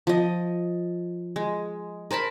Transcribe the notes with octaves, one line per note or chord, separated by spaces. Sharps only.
F3 D#5
G#3
A#4 C5 A5 B5